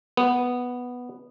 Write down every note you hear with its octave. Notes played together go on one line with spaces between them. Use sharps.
B3